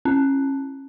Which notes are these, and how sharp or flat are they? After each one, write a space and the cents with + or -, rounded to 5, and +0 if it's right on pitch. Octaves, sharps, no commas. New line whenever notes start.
C#4 -25